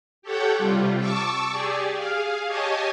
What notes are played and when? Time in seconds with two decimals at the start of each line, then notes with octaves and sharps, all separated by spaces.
0.22 G4 A4 C#5 F#5 G5
0.57 C3 G3 F4
0.98 A5 C#6 D6 E6
1.51 G4 G#4 D5
1.95 G#4 F5
2.46 G4 C#5 D#5 G#5 A5